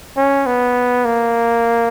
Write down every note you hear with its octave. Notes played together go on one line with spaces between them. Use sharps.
C#4
B3
A#3